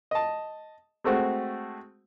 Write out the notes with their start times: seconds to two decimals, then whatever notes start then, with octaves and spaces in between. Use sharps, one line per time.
0.11 D#5 A5
1.04 G#3 A3 C4 F#4